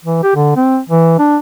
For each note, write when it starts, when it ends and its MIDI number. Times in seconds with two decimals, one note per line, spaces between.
0.05 0.21 52
0.23 0.32 67
0.35 0.52 50
0.56 0.78 60
0.89 1.16 52
1.19 1.37 62